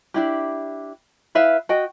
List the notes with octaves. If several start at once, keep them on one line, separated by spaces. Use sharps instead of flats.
D4 E4 G4
E4 B4 E5 F5
F#4 D#5 G5